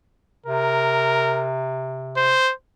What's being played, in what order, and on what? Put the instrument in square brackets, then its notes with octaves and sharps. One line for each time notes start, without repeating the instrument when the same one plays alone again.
[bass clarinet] C3 [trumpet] A#4
[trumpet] C5